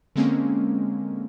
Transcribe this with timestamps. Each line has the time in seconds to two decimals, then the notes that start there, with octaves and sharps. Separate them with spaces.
0.16 D3 G#3 A#3 C4 C#4